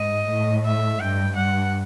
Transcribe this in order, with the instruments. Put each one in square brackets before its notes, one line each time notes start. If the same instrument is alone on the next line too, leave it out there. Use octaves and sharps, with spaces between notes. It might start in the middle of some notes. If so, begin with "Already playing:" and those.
Already playing: [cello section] G#2 [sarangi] D#5
[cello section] A2
[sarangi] E5
[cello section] G2 [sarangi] G5
[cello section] G2 [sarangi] F#5